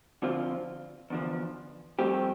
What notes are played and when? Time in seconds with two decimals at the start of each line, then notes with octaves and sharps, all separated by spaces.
0.22 D3 F3 C4 F4
1.10 E2 D3 F3
1.99 G2 F3 A3 C4 G4